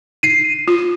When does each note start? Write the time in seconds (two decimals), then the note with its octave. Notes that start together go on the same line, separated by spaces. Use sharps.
0.23 C7 D#7
0.68 F4